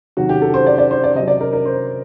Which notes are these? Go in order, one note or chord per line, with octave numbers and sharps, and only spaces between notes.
C3 D#3 F#3 F#4
G4
A4
C5
D5
D5
C5
D5
C3 F#3 D#5
D5
A#4
A#4
C5